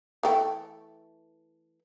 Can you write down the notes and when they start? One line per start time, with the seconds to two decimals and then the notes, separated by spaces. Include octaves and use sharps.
0.23 E3 A3 G5